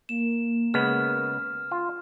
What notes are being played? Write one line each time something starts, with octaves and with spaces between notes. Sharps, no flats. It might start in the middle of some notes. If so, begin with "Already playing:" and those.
A#3 E7
C#3 G#3 B3 F6
F4